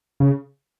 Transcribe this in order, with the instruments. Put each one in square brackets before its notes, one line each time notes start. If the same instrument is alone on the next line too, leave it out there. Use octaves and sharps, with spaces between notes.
[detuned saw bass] C#3